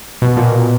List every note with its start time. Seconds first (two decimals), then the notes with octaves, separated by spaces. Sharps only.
0.22 B2
0.37 A#2